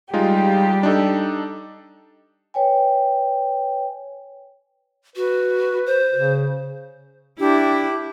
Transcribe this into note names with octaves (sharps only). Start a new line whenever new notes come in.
G3 G#3 D#4 F4 G4
D4 D#4 A4
B4 C#5 G5 G#5
F#4 B4
C5
C#3
D4 E4 G4